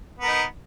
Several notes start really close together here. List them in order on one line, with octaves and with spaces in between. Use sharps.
B3 A#4 D#4